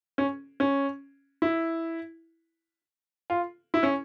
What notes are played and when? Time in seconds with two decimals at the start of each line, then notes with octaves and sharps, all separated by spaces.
0.18 C#4
0.60 C#4
1.42 E4
3.30 F4
3.74 E4
3.83 C#4